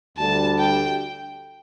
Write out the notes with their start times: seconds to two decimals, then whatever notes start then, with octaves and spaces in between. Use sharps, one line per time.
0.18 D2 D3 G3 A5
0.59 G5